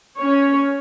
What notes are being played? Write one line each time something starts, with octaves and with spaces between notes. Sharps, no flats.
C#4 C#5